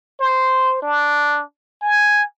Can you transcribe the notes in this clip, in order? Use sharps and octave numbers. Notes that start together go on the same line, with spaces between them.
C5
D4
G#5